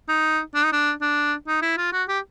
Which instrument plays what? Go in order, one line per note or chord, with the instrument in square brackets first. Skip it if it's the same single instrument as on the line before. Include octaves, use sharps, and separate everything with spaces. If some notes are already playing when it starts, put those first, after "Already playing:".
[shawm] D#4
D4
D#4
D4
D4
D#4
E4
F4
F#4
G4